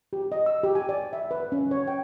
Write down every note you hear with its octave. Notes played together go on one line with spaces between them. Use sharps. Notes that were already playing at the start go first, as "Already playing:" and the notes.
G4
D#5
E6
G4
G#5
D5
E5
B4
C#4
C#5
G5